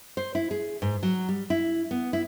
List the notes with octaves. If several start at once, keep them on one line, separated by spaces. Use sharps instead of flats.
C5
E4
G#4
G#2
F#3
G3
E4
B3
E4